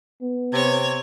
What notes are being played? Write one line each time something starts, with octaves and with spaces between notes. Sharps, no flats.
B3
C3 C#5 G#6